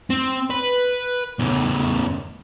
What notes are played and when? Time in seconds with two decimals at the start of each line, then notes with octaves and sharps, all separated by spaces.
0.10 C4
0.50 B4
1.40 E2 C#3